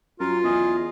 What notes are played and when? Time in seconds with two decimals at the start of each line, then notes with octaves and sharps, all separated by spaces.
0.20 F#2 F4 A#4
0.44 E2 G#4 D#5